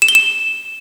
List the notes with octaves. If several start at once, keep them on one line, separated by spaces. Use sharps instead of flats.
E7
G7
E7